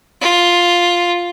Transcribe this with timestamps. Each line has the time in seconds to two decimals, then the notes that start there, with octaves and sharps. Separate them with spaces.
0.21 F4